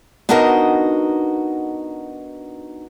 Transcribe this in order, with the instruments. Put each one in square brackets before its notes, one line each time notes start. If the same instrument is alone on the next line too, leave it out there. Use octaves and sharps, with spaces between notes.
[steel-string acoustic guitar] B3 D4 D#4 F#4 A#4 D#5